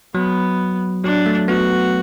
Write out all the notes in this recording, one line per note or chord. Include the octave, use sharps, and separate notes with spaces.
F#3 B3
F#3 D4
A3
B3 F#4